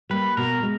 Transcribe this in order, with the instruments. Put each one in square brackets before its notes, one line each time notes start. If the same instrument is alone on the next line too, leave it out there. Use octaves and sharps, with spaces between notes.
[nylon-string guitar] G3 A#3 [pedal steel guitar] B4
[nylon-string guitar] B2 [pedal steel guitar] A#4
[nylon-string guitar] G#3